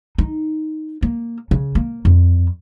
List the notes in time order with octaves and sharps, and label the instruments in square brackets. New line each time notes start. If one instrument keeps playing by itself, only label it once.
[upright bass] D#4
A#3
C#3
A#3
F2